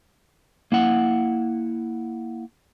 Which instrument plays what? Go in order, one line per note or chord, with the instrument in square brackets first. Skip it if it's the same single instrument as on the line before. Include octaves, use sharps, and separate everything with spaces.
[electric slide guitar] A#3 E4 F#5